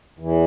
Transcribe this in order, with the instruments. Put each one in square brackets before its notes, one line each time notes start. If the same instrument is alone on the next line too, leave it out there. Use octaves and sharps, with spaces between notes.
[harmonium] E2 E3